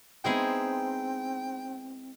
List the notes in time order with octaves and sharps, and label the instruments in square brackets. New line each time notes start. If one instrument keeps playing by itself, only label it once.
[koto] G#3 E4 G#4 [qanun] B3 D#4 C5 [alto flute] C4 [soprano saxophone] G5